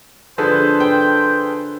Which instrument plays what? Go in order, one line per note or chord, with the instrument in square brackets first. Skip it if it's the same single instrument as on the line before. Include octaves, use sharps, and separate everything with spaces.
[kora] D3 F3 F4 [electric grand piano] G#4 A4 B4 [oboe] C5
[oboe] C5 [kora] G5